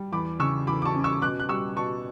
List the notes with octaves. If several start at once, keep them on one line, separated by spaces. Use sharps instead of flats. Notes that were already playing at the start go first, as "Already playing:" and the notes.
Already playing: G3
E2 B5 D6
C#3 C#6 E6
E2 B5 D6
D6
A5 C#6
C#4
C#6 E6
B2 D6 F#6
F#6
G3 C#6 E6
B2 A5 C#6